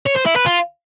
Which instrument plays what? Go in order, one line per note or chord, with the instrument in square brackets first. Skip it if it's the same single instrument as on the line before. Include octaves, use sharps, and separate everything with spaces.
[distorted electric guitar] C#5
C5
E4
B4
F4